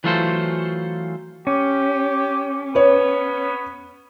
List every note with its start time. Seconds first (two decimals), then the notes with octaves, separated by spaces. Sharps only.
0.04 E3 F#3 A3 F4 A4 C5
1.47 C#4 G4
2.75 B3 B4 C#5